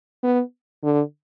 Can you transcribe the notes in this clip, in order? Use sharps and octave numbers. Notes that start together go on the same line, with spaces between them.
B3
D3